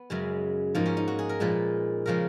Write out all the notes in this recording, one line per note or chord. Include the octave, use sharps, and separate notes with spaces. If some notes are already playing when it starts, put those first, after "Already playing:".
Already playing: B3
F#2 C#3 G#3
G#2 F3 A#3 D#4
C#4
D#4
F#4
G#4
A#4
A#2 F3 G#3 B4
C#3 F3 G#3 A#4